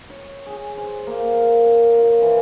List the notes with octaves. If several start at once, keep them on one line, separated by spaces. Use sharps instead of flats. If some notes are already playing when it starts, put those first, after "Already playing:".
C#5
G#4
C5
A#3
A#4
C#5
F4
E3